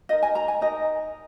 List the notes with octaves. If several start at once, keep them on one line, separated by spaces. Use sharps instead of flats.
D#4 A#4 D#5
G#5
A#5
G#5
D#4 A#4 D#5